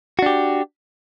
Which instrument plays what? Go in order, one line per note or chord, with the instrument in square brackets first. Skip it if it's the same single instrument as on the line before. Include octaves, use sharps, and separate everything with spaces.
[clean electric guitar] F#4
D4
G4